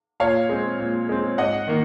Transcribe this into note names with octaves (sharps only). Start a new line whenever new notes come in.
A#2 C#5 F5
G#3 C4
A#2
G#3 C4
G#2 D#5 F#5
D#3 A#3